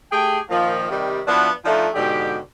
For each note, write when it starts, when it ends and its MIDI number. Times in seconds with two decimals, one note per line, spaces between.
0.11 0.37 57
0.11 0.37 67
0.11 0.37 68
0.11 0.37 79
0.50 0.86 46
0.50 0.86 51
0.50 0.86 53
0.90 1.20 48
0.90 1.20 51
0.90 1.20 55
1.26 1.49 53
1.26 1.49 59
1.26 1.49 62
1.26 1.49 64
1.26 1.49 66
1.64 1.88 53
1.64 1.88 57
1.64 1.88 62
1.64 1.88 63
1.64 1.88 65
1.94 2.37 44
1.94 2.37 47
1.94 2.37 50
1.94 2.37 67